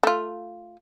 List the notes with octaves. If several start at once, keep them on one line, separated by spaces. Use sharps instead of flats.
A3 F4